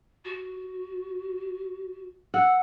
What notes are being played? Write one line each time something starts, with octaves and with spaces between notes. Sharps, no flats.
F#4
F#5 E6